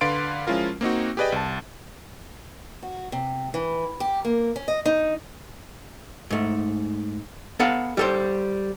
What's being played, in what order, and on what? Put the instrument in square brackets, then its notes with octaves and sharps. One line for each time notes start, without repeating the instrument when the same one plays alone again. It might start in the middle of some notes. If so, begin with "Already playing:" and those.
[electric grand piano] D3 B4 F5 C6 A6 D7
F3 G#3 C#4 E4 F4 A#4
A#3 C4 D#4 F#4
G4 G#4 B4 D5 D#5 G5
C2 A5
[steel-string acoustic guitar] F#4
C3
E3
G4
A#3
C#4
D#5
D#4
[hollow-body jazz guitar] G#2 A3
B3 A4 F5 F#5
G3 A4 C5